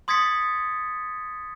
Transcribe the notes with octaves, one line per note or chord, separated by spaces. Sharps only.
C6 D#6 G#6 A6 B6 C#7